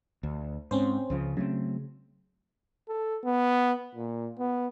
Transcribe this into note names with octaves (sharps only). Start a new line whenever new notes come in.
D2
G#2 C4 C#4 C5
C#2 C#3 F3
C#3 F#3 A3 C4
A4
B3
A#2
B3